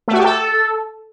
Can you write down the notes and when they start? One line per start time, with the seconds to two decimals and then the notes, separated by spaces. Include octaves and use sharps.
0.08 A3
0.13 F#4
0.19 G4
0.24 A4